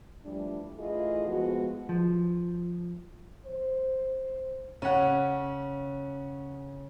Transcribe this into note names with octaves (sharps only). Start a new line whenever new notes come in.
E3 F3 G3 A3 D4
E3 A3 E4 F4 G#4 D#5
F3 G#3 B3 F#4
F3
C5
C#3 C#4 F#5